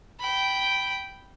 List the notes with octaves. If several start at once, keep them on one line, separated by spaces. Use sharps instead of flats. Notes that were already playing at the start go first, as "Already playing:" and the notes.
G5 B5